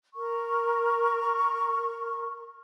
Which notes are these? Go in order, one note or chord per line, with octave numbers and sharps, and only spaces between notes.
A#4 C#6